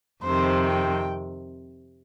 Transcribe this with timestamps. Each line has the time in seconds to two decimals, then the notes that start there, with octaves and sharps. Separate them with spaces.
0.24 F2 C3 D#3 C5
0.67 G5